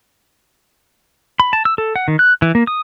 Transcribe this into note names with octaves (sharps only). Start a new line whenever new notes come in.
B5
A5
E6
A4
F#5
D#3
F#6
E3
A#3
D#6